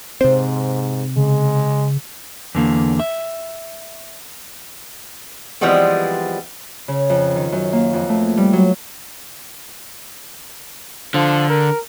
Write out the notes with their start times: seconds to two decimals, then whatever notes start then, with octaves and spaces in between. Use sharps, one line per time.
0.21 G#2 C3 C4 C5
1.16 C#3 G#3
2.55 E2 D3 A#3
3.00 E5
5.61 E3 F3 G3 G#3 B3 C4
6.88 C#3
7.10 F2
7.36 D#3
7.52 F#2
7.73 A#3
7.93 F2
8.09 A3
8.37 G3
8.53 F#3
11.14 D3 F3
11.49 A#4